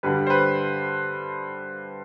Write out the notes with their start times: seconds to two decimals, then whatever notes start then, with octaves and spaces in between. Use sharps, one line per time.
0.03 G2 D3 G3 B4
0.27 C5
0.30 B4